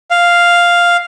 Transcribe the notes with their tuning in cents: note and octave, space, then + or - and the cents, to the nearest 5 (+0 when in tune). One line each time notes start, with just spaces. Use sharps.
F5 +0